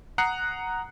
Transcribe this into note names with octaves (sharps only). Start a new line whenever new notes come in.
F#5 A#5 D#6 F#6 C7 C#7